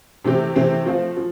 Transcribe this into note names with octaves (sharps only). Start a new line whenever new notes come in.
C3 E3 A3 C4 G4
C3 E3 A3 C4 G4
F3 A3 C4 F4
F3